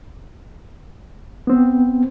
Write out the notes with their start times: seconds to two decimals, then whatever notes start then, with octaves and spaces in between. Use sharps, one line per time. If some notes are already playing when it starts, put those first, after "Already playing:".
1.47 B3 C4